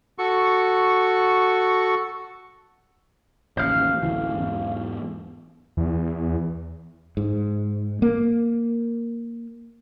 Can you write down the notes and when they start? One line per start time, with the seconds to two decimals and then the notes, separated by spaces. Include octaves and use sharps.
0.18 F#4 A4 C#6
3.57 A1 D#2 C5 F5
4.03 A1 D2 E3
4.34 E2 G#2
5.77 E2
7.17 G#2
8.02 A#3